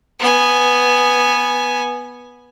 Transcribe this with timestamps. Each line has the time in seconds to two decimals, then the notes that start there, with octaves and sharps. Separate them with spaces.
0.20 B3 G#5